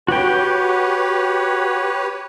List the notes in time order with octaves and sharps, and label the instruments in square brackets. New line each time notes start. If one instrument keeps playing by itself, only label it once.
[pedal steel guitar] F#4 G5 [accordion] G4 B4 C#5